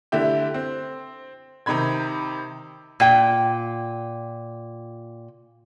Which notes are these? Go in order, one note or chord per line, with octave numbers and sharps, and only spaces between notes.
D3 A3 E4 G4
C4
C3 D#3 D#4 B5 G#6
A#2 G5